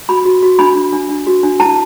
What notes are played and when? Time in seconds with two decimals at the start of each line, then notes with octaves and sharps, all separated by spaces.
0.09 F#4 B5
0.25 F#4
0.42 F#4
0.59 D4 B5
0.76 D4
0.93 D4
1.09 D4
1.27 F#4
1.43 D4
1.60 E4 A5